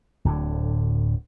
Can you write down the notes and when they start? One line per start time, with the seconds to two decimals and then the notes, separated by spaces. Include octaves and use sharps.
0.25 D1 A2 D3